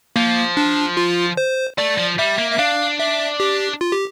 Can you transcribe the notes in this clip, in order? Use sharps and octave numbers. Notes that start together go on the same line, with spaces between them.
F3 A#3
D4
F4
C5
A3 D5
F3
G3 E5
A#3
E5
D4 F5
E5
G4
F4
G4